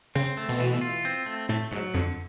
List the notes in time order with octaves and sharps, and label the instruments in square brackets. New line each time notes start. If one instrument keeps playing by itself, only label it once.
[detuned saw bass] C#3 [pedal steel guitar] C4
[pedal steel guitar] A3
[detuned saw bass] B2
[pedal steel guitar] E3
F4
C4
A3
[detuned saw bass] A2 [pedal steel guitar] A3
[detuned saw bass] G#2 [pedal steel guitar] F#3
[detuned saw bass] F2 [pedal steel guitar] D3